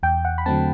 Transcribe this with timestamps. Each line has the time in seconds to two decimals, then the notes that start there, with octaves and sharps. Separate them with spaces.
0.03 E2 G5
0.25 F#5
0.38 B5
0.46 D3 F#3 A3 C4 A5